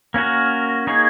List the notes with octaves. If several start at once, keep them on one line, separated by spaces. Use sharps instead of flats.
A#3 C#4 F#4 A#4
A#3 D#4 G#4 C#5